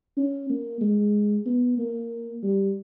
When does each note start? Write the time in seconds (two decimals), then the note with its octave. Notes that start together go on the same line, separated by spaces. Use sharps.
0.17 C#4
0.50 A#3
0.81 G#3
1.46 B3
1.78 A#3
2.43 G3